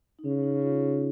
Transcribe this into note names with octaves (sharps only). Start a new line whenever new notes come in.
D#4
C#3 C#4
D#4
F4